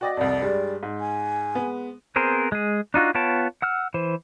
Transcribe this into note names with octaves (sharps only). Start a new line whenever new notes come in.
F#4 D5 D#5 G5
C2 F2 D5
G2 G3 G#3
G#2
G#5
G#3 B3
B3 C4 G#4 A#4 C5
G#3 G#4
D4 D#4 F4 F#4
B3 F4 C#5 G5 A5
F#5 E6 F6
E3 C5